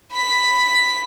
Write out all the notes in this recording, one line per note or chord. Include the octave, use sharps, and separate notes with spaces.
B5 B6